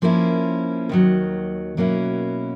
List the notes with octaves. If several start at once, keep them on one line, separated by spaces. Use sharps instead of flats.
F3 A#3 C#4 E4
D#2 D#3 F#3
B2 F#3 A#3 C#4 E4